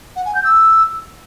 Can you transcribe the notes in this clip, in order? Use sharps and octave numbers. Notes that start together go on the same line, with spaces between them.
F#5
G#5
G6
E6